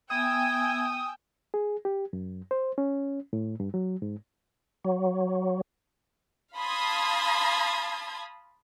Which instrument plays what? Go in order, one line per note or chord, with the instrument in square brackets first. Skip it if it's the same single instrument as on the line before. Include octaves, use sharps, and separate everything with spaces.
[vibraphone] B3 E5 [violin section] G5 G#5 E6 [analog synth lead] D#6 [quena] G#6
[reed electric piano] G#4
G4
F#2
C5
C#4
A2
G2
F#3
G#2
[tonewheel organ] F#3
[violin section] F5 A5 B5 C6 D#6 G#6